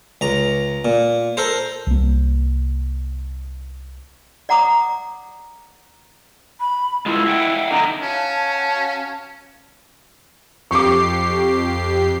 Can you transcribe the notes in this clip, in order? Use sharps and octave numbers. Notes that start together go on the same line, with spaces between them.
C#2 A#5
A#2
A4 A#4 C5
C2 A#3
D5 F#5 A#5 D6 D#6
B5
G#3 A3 E4 F4
E5 F#5 G5
D3 D#4 E4 A#5
C#4 F#4 F5 A5
F2 G4 C#6 D6 C7